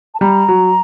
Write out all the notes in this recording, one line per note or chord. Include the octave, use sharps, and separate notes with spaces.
A5
G3 A#5
F#3